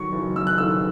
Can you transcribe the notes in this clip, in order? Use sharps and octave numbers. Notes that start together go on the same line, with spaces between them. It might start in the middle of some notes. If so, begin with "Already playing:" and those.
Already playing: D#3 F#3 C#6
F#1
F#2 E6
F#6
D#3 E6